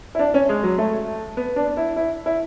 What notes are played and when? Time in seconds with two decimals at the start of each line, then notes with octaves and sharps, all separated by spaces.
0.15 E4
0.19 D4
0.34 C#4
0.49 G#3
0.63 F#3
0.78 A3
1.37 B3
1.56 D4
1.77 E4
1.96 E4
2.26 E4